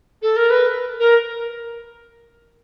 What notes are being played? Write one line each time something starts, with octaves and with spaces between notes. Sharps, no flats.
A4
A#4
B4
A#4